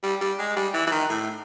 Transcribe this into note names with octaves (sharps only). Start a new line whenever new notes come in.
G3
G3
G#3
G3
E3
E3
D#3
A2